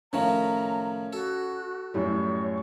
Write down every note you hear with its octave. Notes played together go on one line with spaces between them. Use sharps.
A2 D#3 F3 C#4 A#5
F#4 A4
F#2 A2 G3 C#5